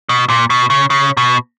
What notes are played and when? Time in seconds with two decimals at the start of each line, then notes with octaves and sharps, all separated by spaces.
0.09 B2
0.30 A#2
0.50 B2
0.70 C#3
0.90 C#3
1.17 B2